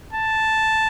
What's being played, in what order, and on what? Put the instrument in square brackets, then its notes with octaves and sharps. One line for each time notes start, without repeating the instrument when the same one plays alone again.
[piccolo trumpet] A5